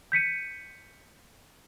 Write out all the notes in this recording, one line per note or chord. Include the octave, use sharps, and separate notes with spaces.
G6 B6 C#7 D#7